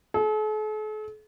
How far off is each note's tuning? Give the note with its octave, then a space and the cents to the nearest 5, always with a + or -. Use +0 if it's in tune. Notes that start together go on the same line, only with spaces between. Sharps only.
A4 -45